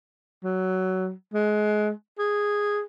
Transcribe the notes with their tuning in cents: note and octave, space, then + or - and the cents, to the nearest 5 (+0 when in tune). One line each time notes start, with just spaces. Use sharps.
F#3 +15
G#3 +25
G#4 -10